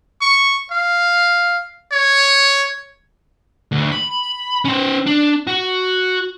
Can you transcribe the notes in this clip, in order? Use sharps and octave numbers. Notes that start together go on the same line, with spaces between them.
C#6
F5
C#5
D2
B5
C#4 C5
D4
F#4